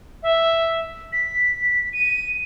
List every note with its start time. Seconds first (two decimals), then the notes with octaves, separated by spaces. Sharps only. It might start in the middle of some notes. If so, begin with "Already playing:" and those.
0.23 E5
1.13 B6
1.93 D#7